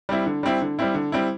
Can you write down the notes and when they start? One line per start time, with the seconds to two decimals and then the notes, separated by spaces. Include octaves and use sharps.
0.09 G3 C4 E4
0.26 D3
0.43 G3 C4 E4
0.61 D3
0.79 G3 C4 E4
0.95 D3
1.12 G3 C4 E4